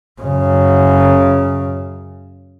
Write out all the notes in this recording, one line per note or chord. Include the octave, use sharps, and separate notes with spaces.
F#2 C#3